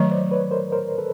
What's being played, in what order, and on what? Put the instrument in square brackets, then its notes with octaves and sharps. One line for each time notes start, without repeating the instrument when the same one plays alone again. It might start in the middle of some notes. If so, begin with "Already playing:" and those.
Already playing: [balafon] D#3 F#3 A3 [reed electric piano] C#5 D#5
[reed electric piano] C5 D5
B4 C#5
A#4 C5
A#4 C5
A4 B4